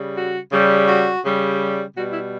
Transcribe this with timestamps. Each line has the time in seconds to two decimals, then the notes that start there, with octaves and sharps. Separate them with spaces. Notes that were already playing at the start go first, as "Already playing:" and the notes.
Already playing: C#3 G3
0.16 F#4
0.52 C#3 G3
0.88 F#4
1.24 C#3 G3
1.95 B2 G3 F#4
2.13 E4